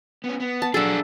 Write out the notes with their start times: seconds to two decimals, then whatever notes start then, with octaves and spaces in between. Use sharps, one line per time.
0.24 B3 C#4
0.40 B3
0.62 A5
0.74 F#3 D4 G#4 A4 E5